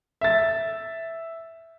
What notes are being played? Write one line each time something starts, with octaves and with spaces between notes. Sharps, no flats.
E5 A6